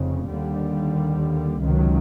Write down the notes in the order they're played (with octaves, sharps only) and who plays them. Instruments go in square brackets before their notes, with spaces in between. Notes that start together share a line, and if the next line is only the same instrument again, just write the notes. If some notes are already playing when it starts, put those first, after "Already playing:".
Already playing: [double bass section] F1 F2 C#3
D#2 D3 G3
C#2 C3 D#3 F#3